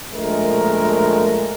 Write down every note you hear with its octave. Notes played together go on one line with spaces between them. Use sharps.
A#1 G#3 A3 A#4